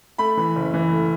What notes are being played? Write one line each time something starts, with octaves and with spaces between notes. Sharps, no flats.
A3 B5
E3
F#1
E3
A3